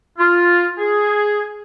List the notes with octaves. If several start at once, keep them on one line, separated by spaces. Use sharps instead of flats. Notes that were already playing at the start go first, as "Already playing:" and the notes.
F4
G#4